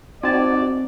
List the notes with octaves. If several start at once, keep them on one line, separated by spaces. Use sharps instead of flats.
C4 D#4 F#4 D5 G#5 A5